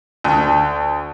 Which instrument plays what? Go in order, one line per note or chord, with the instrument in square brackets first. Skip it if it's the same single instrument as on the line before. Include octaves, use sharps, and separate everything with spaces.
[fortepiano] D2